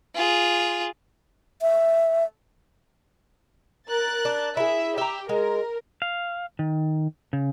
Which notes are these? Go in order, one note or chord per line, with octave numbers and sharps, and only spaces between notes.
F4 G#4
E5
A#4 F#6 A6
D4
E4 G#4 E5
G4 E5 A#5
G#3 A#4
F5
D#3
C#3